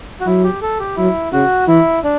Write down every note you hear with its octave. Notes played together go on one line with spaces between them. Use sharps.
F#4
F#3 E4
G4
A4
G4
F#3 E4
C#3 F#4
E3 E4
D4